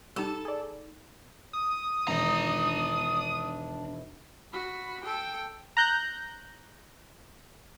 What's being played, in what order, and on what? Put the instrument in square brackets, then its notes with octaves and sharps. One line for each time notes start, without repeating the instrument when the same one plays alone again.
[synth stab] G3 G4 [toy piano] D#4 A#5 B5 [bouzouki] A4
[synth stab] G#4 D5
[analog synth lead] D#6
[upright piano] E1 D#3 [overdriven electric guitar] D4 A#5
[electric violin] F#4 B5
A4 G5
[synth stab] A#5 F#6 G6